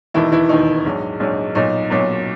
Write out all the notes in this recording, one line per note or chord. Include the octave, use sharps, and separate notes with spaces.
E1 D#2 D#3 E3 E4
E3 E4
E1 D#2 D#3 D#4
A#1 G#2 F#3
A#1 G#2 F#3
B1 A#2 F#3 D#4
B1 A#2 F#3